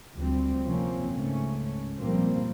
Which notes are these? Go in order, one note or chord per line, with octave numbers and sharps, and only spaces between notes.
D2 F3 G3 C4
C3 F3 A#3 C4 C#4
C#2 G#2 A3 C#4
A#2 F3 G3 A#3 C4